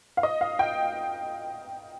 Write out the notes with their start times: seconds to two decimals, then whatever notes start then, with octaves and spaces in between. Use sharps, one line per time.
0.17 F5
0.23 D#5
0.41 F5
0.59 G5